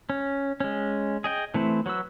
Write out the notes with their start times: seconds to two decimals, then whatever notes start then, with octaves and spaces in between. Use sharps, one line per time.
0.10 C#4
0.60 G#3 C#4
1.24 G#4 D#5 G5
1.54 E3 A3 C4 E4
1.86 F#3 F#4 B4 E6